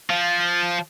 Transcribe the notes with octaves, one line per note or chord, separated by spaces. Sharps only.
F3